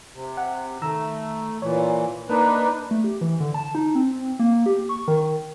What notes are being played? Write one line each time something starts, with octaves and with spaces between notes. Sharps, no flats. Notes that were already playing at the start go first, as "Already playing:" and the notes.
C3
F#5
D#3 A3 A#5 E6
A#2 E3 C#5
A#3 D4 D#4 B4
A3
G4
E3
D3
A5
D#4
C4
A#3
G4
C#6
D#3